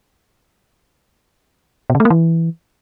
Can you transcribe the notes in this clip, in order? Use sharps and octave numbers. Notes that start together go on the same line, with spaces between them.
B2
C#3
A3
A#3
E3